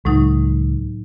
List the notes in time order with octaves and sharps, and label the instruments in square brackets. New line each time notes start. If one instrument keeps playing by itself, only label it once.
[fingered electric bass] C#2 [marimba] A2 F#3 D#4